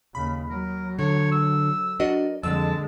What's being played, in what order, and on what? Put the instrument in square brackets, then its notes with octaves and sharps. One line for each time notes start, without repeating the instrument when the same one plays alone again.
[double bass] D#2 C#3 [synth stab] B5
[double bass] F#3 [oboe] A#4
[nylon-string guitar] D3 [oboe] C#5
[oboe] E6
[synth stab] D4 F#4 [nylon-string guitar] A#4 D5 D#5
[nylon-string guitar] F2 [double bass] D3 G#3 [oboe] A5 [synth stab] E6